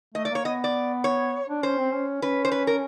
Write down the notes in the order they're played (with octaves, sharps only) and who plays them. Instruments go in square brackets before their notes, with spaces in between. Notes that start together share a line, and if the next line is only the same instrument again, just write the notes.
[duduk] A3 [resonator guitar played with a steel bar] D#5
[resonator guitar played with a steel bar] D5
[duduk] A#3 [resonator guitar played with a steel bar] C#5
[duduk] B3 [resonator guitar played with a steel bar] D#5
[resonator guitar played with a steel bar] D5
C#5
[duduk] D4
[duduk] C#4 [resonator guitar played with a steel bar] C5
[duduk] C4
C#4
[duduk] C#4 [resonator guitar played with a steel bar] B4
[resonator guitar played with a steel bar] C5
B4
A#4